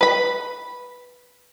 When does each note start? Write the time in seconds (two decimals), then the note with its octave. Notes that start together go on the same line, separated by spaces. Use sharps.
0.01 B4 B5